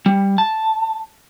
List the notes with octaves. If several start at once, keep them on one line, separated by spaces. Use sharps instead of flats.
G3
A5